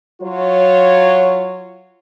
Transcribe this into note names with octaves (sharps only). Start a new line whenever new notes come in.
F#3 F4 C#5